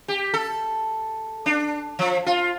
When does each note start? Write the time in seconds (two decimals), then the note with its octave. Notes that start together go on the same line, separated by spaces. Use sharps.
0.08 G4
0.34 A4
1.46 D4
1.99 F3
2.26 F4